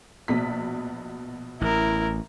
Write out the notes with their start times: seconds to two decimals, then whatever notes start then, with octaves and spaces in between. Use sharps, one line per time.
0.28 A#1 B2 B6
1.61 A1 E4 A#4